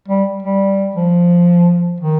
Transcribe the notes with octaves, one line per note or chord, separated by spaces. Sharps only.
G3
G3
F3
D#3